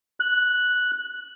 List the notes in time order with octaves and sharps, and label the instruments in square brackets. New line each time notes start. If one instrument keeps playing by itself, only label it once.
[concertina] F#6